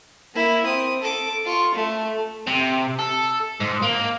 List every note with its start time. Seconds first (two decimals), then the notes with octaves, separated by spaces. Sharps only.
0.35 A#3 E4
0.64 C4 D#6
1.00 A4 D6
1.45 F4 C#6
1.74 A3
2.47 C3
2.99 A4
3.60 G#2
3.82 A#3